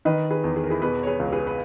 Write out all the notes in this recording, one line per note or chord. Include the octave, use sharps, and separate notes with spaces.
D#3 B4 D#5
G#4 B4
E2
G#4
A#4
E4 G#4
B2 G#4 B4
C#5
G#4 B4
C#2
G#4 B4
B4